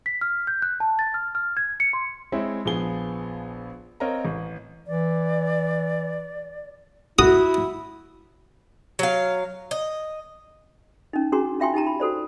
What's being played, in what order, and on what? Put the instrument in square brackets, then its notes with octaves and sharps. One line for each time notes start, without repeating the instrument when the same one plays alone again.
[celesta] B6
F6
G6
F#6
A5
A6
F6
F6
G#6
C#7
C6
[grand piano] G#3 C4 E4 C#5 E5
A#1 F3 B3 G#4 G7
C4 A#4 C#5 D#5 F5 A#5
A1
[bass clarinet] E3 [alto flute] D5
[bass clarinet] E4 [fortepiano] F#4 [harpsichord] D#6
[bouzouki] F#3 F5
D#5
[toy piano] C#4 D#4
C#4 D4 F#4 G#4 A#5 C6
C#4 F4 E5 G5 G#5 C6
D#4 G4 A5 A#5
B5
F#4 A4 C5 D5